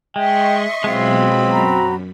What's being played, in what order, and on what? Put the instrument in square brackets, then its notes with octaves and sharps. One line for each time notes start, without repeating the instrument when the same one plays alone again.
[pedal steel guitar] G#3 [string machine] D#5 C6 C#6 [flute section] E5 [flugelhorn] G5
[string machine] B2 F#3 B5 [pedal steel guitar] G#3 F4 [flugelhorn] C4
[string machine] F#2 [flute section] F#4 A#5 B5